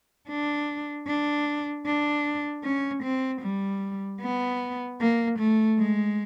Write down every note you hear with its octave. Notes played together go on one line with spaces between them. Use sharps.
D4
D4
D4
C#4
C4
G3
B3
A#3
A3
G#3